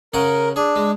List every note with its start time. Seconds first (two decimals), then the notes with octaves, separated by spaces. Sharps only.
0.14 C#3 C#4 A#4 F#5
0.56 D4 G#4
0.76 G#3